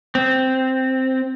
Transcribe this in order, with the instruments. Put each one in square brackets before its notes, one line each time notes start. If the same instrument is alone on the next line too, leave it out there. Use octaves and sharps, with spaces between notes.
[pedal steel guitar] C4